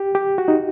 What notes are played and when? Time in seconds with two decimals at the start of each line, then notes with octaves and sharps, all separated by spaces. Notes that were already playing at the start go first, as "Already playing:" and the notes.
Already playing: G4
0.15 G4
0.38 F#4
0.48 D#4